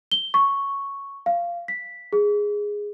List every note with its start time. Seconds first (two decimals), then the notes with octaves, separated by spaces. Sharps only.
0.12 G7
0.34 C#6
1.26 F5
1.68 B6
2.13 G#4